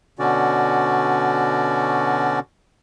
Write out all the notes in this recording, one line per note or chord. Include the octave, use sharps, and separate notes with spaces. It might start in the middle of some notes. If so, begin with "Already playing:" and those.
B2 D3 C#4 F#4 D5